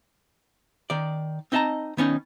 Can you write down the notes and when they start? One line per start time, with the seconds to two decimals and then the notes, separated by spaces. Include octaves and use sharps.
0.90 D#3 D5
1.52 C4 D#4 D#5 E5 A5 A#5
1.97 D#3 B3 C#4 D#4